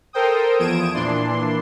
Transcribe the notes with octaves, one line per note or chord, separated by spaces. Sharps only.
A4 A#4 C5 G5 D#6
E2 F3 D#6 G#6 D7 E7
A#2 E3 D4 C6